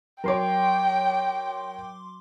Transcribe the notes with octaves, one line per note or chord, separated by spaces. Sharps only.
F#3 A#4 C#5 G5 C6 D6